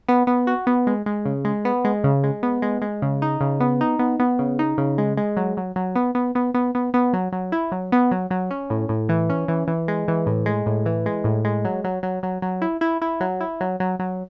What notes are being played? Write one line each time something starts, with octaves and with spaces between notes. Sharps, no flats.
B3
B3
F#4
B3
G#3
G#3
C#3
G#3
B3
G#3
C#3
G#3
B3
G#3
G#3
C#3
D#4
C#3
B3
D#4
B3
B3
C#3
D#4
C#3
G#3
G#3
F#3
F#3
F#3
B3
B3
B3
B3
B3
B3
F#3
F#3
E4
F#3
B3
F#3
F#3
C#4
A2
A2
E3
C#4
E3
E3
G#3
E3
A2
G#3
A2
E3
G#3
A2
G#3
F#3
F#3
F#3
F#3
F#3
E4
E4
E4
F#3
E4
F#3
F#3
F#3